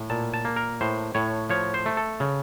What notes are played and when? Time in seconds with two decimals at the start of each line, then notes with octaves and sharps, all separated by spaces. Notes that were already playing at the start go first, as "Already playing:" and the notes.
Already playing: A2
0.10 A#2 A5
0.34 A5
0.45 A#3
0.56 A#4
0.81 A2 C5
1.15 A2 C#5
1.50 F3 C#5
1.74 C5
1.86 A3
1.97 A4
2.20 C#3